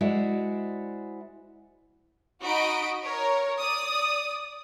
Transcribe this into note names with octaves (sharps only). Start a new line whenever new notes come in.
G#3 E4 F#4 C5 D5 E5
D#4 F#4 D#5 B5 D7
A#4 C#5
D5 D#6